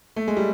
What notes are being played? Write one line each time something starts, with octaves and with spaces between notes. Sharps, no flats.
A3
G#3
G3